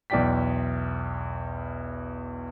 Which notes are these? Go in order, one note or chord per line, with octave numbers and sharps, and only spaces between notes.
B1 E2 E4 D5 G5 B6